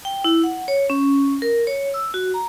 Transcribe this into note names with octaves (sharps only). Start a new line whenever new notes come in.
G5
E4
F#5
C#5
C#4
A#4
C#5
E6
F#4
A#5